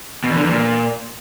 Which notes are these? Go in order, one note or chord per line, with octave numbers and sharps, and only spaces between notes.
B2
E2
D3
E2
A#2